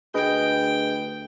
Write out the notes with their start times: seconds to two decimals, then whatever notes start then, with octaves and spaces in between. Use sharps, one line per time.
0.14 D2 G#4 B4 D#5 G5